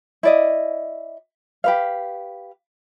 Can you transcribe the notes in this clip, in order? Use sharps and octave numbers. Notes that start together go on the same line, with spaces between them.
E4 D5 D#5
G4 B4 F5